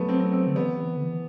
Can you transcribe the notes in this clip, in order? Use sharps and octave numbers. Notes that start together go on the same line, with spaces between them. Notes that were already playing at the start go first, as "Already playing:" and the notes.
Already playing: F#3 A3 B3
C4
C4
C4
D3
E3 B3
D3
E3